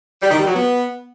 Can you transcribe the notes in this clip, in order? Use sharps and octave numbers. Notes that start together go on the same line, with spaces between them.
G3
D#3
G3
F#3
B3